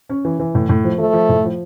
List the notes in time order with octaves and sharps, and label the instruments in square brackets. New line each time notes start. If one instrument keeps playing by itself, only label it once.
[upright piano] C#4
E3
E3
A2
A2
F3
[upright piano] F3 [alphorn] A3
[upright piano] F3
A2
F3